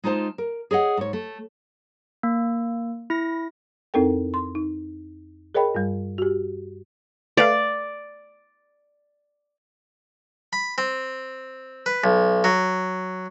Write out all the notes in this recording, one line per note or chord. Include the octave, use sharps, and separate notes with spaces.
G#3 D#4 F4 C5 A5
A#4
G#4 C#5 D#5 F#5
G#2 C#5
A3
A#3
E4 A#6
F2 C4 D#4 A4 A#4 G5
C6
D#4
G#4 A#4 C#5 D#5 G5 B5
G2 G3
F#4 G4
A3 B4 D5 F5
B5
C4
B4
B1
F#3